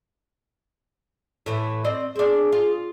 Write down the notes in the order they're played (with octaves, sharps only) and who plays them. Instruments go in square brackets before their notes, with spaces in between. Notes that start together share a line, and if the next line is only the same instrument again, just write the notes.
[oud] A2 E3
C4 D5 D#5
[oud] C4 D4 [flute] G#4
[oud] F4